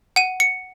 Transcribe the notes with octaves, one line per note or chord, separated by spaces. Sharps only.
F#5 D#7
C#7